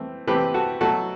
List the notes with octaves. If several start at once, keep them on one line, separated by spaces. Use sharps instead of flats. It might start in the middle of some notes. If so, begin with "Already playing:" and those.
Already playing: E3 A3 C4
E3 A3 C4 G4 B4
F#4 A4
B2 F#3 A3 F#4 A4